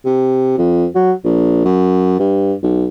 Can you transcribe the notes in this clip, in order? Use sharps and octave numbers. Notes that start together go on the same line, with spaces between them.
C3
F2
F#3
A#1
F#2
G2
B1